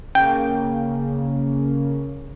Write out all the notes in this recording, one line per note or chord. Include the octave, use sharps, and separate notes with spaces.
C#3 A#3 G5